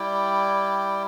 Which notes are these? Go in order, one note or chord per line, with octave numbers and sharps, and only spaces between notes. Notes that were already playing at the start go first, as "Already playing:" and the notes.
Already playing: G3 E4 D5 G5